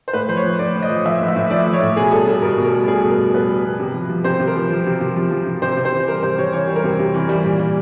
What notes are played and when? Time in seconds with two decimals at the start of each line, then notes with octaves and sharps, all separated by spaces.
0.08 C5
0.13 A2 B4
0.29 F3 C5
0.37 C#5
0.45 F3
0.56 C#5
0.59 A2 D5
0.75 A2
0.82 D#5
0.90 F3
1.05 F3 E5
1.21 A2
1.28 E5
1.36 A2
1.50 F3 D5
1.67 F3
1.73 C#5
1.82 A2
1.97 B2 G#4
2.12 G3 A4
2.27 G3 A4
2.42 B2 A#4
2.58 B2
2.64 A#4
2.73 G3
2.88 G3 G#4
3.00 B2 A4
3.11 A#4
3.19 B2
3.34 G3 B4
3.49 G3
3.64 B2
3.80 C3
3.94 F3
4.09 F3
4.24 C3 C5
4.40 C3
4.47 A#4
4.56 F3
4.70 F3
4.86 C3
5.00 C3
5.16 F3
5.31 F3
5.46 C3
5.62 C3 C5
5.77 C3
5.85 C5
5.92 E3
6.08 G3 A#4
6.23 C3 C5
6.38 C3 C#5
6.53 E3 C#5
6.68 G3
6.76 A#4
6.84 C3
6.99 C3
7.14 E3
7.29 G3
7.44 A#2
7.60 G3